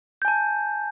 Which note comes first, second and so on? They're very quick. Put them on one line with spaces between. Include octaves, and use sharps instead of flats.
G6 G#5 A5